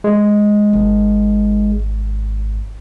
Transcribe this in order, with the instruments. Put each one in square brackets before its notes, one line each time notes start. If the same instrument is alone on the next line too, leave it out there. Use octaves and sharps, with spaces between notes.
[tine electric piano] G#3
[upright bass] G#1